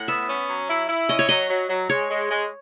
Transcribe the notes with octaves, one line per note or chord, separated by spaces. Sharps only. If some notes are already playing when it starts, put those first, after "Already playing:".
Already playing: A2 F#5
B3 E5
C#4
F#3
E4
E4
C#4 D#5
C#5
F#3 D#5
F#3
F#3
G#3 C#5
G#3
G#3